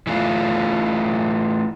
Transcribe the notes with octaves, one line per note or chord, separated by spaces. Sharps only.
E3 A3 F4